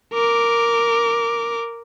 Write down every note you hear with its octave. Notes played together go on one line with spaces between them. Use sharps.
A#4 D6